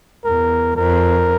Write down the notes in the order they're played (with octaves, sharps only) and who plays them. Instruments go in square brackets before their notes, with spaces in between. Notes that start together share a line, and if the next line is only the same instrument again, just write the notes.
[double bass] E2 [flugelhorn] A#4
[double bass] F2 [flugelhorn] A#4